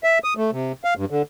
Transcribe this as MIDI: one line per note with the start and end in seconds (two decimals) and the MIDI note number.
0.04 0.19 76
0.24 0.34 87
0.37 0.51 57
0.52 0.72 48
0.84 0.94 77
0.97 1.05 43
1.10 1.22 50